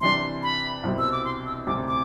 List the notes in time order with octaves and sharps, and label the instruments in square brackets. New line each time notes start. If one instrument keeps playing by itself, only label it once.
[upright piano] C3 E3 G3 D4 [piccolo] C6
[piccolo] B5
[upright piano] C2 B2 G3 C4 E4
[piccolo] E6
D6
C6
E6
[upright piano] D2 C3 G3 C4 [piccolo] D6
[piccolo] D6